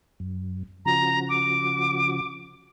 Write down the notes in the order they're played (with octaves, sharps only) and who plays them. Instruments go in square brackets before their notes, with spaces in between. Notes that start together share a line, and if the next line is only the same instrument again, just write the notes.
[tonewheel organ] F#2
[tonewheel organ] C#3 F3 F#4 [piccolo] A#5
[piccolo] D6